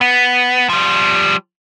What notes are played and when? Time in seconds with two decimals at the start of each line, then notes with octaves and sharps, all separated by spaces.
0.01 B3
0.69 F3 G3